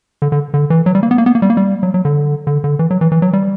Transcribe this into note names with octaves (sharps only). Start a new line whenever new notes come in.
D3
D3
D3
E3
F#3
G3
A#3
B3
A#3
B3
A#3
G3
A#3
G3
F#3
F#3
D3
D3
D3
E3
F#3
E3
E3
F#3
G3